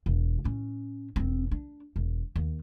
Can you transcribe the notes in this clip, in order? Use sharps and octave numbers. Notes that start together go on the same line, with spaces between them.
E1
A2 C#4
E1 C4
D4
E1
D#2